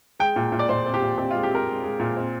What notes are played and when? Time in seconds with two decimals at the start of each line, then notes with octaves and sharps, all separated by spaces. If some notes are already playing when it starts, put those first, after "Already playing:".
0.19 G#3 G5
0.36 A#2
0.52 A#2
0.59 D5
0.69 A#2 C5
0.86 C4
0.94 G4
1.02 A#2
1.18 C4 G4
1.31 F4
1.35 G#3
1.43 G4
1.50 C4 A#4
1.67 G#3
1.84 G#3
2.00 A#2
2.17 C4